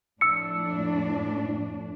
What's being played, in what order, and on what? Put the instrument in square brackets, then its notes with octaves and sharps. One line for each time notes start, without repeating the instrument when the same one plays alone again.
[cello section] F2 A2 D4 [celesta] E6 C#7